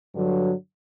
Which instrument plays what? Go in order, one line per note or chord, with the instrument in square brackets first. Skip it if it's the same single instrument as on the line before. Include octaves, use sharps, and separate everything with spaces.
[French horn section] G2 D3 F#3